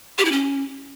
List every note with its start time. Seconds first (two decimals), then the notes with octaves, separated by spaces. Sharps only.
0.18 G4
0.25 E4
0.32 C#4